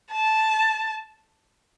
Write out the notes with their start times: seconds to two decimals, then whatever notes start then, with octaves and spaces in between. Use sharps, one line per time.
0.12 A5